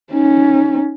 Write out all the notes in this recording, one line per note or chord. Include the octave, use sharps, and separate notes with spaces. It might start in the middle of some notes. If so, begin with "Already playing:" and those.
C#4 D#4